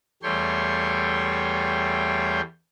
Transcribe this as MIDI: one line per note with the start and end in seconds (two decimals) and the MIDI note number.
0.23 2.41 40
0.23 2.41 55
0.23 2.41 57
0.23 2.41 73
0.23 2.41 79
0.23 2.41 84